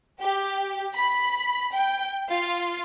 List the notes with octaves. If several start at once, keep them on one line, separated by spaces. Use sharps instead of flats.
G4
B5
G5
F4